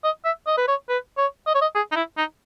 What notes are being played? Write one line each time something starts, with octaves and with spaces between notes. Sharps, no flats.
D#5
E5
D#5
B4
C#5
B4
C#5
D#5
C#5
D#5
G#4
D#4
E4
D#4